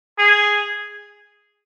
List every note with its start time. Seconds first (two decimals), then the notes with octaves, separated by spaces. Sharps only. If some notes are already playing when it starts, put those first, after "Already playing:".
0.19 G#4